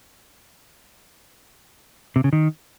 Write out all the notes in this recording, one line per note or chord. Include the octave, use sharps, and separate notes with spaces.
C3
C#3
D#3